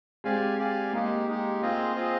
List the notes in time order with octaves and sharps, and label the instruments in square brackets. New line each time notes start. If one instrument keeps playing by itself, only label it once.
[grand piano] G#3 C4 [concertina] G4 D5 F5 G#5
[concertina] G4 D5 F5 G#5
[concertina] G#3 D#4 G4 [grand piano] A#3
[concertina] G#3 D#4 G4
[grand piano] A#3 [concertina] C4 F4 G#4 C5 D#5
[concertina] C4 F4 G#4 C5 D#5